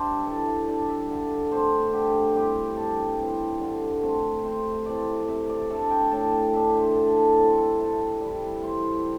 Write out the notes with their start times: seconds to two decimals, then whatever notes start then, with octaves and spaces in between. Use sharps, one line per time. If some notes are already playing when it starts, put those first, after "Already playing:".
Already playing: G3 D4 C5 D5 E5
0.26 E3 A4
0.46 E5
0.67 G3 D4 D5
0.88 E5
1.10 D3
1.51 A3 C4 C5
1.93 D3 G4
2.35 G3 C4 E4 G4
2.77 G2 A4
3.19 E3 C4
3.61 D3
4.02 A3 C4
4.45 C3 C5
4.86 E3 A3 C4 D5
5.28 C3 E5
5.50 D5
5.70 A3 D4 A4
5.91 G5
6.11 A2 A5
6.33 G5
6.53 A3 D4 E5
6.75 C5
6.96 D3 A4
7.17 A4
7.37 G3 C4 E4 A4
7.58 A4
7.79 C3 A4
8.21 G3 E4
8.63 E3 C5